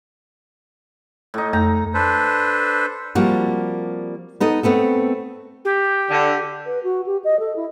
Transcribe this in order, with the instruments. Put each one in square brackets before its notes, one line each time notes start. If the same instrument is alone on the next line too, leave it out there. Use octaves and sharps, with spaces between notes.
[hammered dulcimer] A2 D#4
[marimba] F2 A3 G6 [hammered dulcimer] A#5
[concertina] D4 A4 B4 C5
[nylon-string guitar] F3 G3 A#3 C4 F#4 G4
B3 D#4 A4 D#5
A3 B3 C4 A4
[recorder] G4
[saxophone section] D3
[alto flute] B4
F#4
G4
D#5
A4
E4